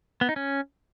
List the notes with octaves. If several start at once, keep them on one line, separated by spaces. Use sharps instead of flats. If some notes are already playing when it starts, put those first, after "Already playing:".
B3
D#4
C#4